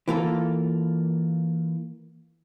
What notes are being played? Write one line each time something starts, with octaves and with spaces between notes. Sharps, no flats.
E3 A#3 F4 A4